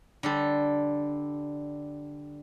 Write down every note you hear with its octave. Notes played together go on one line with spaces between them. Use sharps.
D3 G3 A4